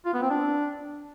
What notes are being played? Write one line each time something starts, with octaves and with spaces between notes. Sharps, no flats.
F4
B3
C4
D4